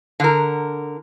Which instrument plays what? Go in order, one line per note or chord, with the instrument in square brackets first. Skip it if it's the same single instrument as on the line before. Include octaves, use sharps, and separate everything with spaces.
[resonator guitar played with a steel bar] D3 A#4